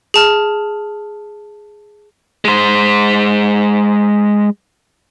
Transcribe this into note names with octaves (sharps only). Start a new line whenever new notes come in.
G#4 A5 F6
G#3 C5